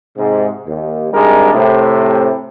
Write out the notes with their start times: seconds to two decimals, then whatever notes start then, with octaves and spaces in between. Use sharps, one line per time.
0.16 G#2 C3
0.67 D#2
1.12 G#1 G3 G#3 D4 A#4
1.53 A2 C3